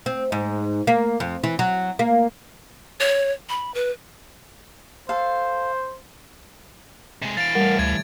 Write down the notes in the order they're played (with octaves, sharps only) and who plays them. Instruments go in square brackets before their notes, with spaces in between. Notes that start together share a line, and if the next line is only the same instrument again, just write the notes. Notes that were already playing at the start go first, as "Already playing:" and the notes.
[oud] C4
G#2
A#3
F2
E3
F#3
A#3
[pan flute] C#5
B5
B4
[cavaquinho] A4 F5 [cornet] C5
[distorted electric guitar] C3 G#3
[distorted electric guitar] E3 F5 [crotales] A6 D7
[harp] A2 G3 [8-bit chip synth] A#4 F#5
[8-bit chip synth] D2 [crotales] G#6